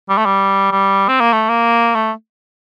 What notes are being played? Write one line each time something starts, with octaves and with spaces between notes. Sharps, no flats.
G3
A3
G3
G3
C4
A#3
A3
A#3
A3